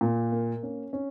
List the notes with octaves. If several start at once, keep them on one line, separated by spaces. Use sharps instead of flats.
A#2
A#3
C#4
C#4